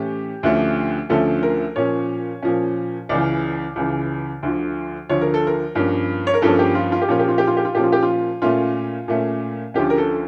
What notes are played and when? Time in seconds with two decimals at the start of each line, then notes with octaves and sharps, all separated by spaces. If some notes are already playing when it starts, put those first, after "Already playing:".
Already playing: A2 E3 A3 C#4 G4
0.43 D2 D3 F3 A3 C#4
1.09 D2 D3 F3 A3 C#4 A4
1.43 A#4
1.76 A#2 F3 C#4 C#5
2.42 A#2 F3 C#4
3.09 C#2 C#3 E3 D5
3.76 C#2 C#3 E3
4.43 D2 D3 F3
5.09 D2 D3 F3 C#5
5.21 A#4
5.34 A4
5.47 A#4
5.75 G2 F3 A#3 C#4
6.27 C#5
6.34 A#4
6.42 G2 F3 A#3 C#4 A4
6.59 G4
6.75 F4
6.92 F4
7.01 G4
7.08 A#2 F3 A#3 C#4 F4
7.19 G4
7.28 F4
7.38 G4
7.47 F4
7.57 G4
7.65 F4
7.75 A#2 F3 A#3 C#4 G4
7.84 F4
7.92 G4
8.03 F4
8.42 A#2 A3 C#4 F4
9.08 A#2 A3 C#4
9.74 D2 D3 F3 C#4 G4
9.90 A#4
9.98 A4